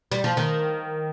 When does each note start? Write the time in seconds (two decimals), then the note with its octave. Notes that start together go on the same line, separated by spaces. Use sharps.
0.12 G3
0.24 F3
0.37 D#3